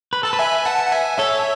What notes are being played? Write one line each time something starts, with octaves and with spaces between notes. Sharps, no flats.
B4
A4 A5
B4
E5 G#5
F#5 A5
F#5
E5 G#5
A4 C#5 E5